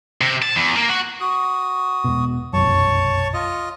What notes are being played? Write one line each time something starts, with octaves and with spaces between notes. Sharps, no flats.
C3
A5
E2
A#3
F#4
F#4 D#6
E1 B2
F1 B1 F#2 C#5 A5 C#6
F4 D#5